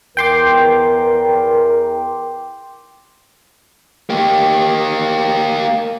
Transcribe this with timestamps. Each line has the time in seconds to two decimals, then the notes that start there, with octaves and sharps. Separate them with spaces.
0.17 E2 A#4 G5 C6 D6
4.10 A#3 G4